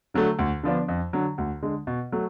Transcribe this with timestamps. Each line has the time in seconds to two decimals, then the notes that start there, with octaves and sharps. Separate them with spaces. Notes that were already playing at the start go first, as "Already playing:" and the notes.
0.14 D3 F#3 A3
0.39 D2
0.63 D3 F3 B3 D4
0.88 F2
1.13 D3 F#3
1.38 D2
1.62 D3 G#3
1.87 B2
2.12 F#3 A3